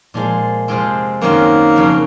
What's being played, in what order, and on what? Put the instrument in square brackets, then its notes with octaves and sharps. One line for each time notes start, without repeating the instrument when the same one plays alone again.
[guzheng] A#2 F3 G#3
F2 C3 F3 G#3 C4
[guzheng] F#2 D#3 F#3 C4 [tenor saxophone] A#3
[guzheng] F2 C#3 F#3